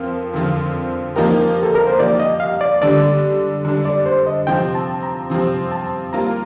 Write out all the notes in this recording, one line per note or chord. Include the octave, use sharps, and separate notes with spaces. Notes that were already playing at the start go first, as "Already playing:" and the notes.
Already playing: F2 F3 C4 F4 A#4
F2 D3 F3 C4 F4
F3 A#3 D#4 G4 A#4
A4
A#4
C5
F3 A#3 D#4 G4 D5
D#5
F5
D5
D3 G3 D4 D5
D3 G3 D4
D5
C5
D#5
C3 F3 C4 G5
A5
A#5
C3 F3 C4
A5
G3 A#3 F4 A#4 A#5